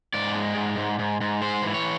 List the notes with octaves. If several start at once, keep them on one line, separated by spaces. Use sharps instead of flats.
G#2 D5
G#3
G#2
G#2
G#2
G#2
G#3 C5
E3
C#5